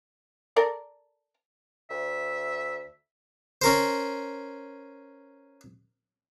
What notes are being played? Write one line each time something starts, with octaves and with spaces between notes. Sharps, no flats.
A4 A#4 D5
D2 E5
C#4 A#4 C5